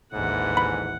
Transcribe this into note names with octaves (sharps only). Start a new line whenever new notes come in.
A1 D#2 G#2 D3 E3 F#5
B5